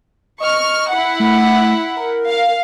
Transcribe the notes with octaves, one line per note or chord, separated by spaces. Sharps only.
D#5 C#6 F6
E4 F#5
A3
A#4
F5